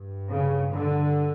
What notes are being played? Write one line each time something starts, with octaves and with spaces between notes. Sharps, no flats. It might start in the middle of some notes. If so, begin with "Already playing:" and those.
Already playing: G2
C#3
D3